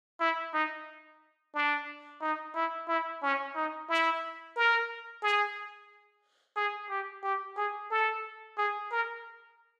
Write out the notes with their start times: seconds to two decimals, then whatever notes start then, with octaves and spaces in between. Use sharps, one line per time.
0.20 E4
0.53 D#4
1.54 D4
2.22 D#4
2.56 E4
2.88 E4
3.23 C#4
3.56 D#4
3.89 E4
4.57 A#4
5.22 G#4
6.57 G#4
6.90 G4
7.24 G4
7.57 G#4
7.91 A4
8.58 G#4
8.92 A#4